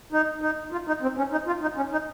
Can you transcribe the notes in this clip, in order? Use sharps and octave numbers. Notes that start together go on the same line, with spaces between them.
D#4
D#4
F4
D#4
C4
C#4
D#4
F4
D#4
C#4
D#4